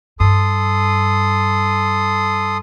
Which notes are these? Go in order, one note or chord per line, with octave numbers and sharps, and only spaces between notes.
G2 A4 C6 D#6